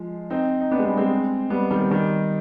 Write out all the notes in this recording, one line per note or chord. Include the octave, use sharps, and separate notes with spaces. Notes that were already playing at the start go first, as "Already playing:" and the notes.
Already playing: F3 G#3
C4 D#4
D#4
B3 D4
G#3
G3 B3
G#3 C4
G3 B3
D#3 G3
D#3 G3